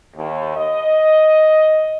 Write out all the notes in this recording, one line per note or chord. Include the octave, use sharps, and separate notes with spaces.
D#2
D#5